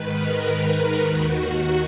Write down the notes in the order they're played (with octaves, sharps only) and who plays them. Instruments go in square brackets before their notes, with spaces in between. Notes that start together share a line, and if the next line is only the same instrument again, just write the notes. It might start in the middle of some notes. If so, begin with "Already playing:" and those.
Already playing: [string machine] G#2 D#3 B4
A#4
D#2 D#3 F#4
F#4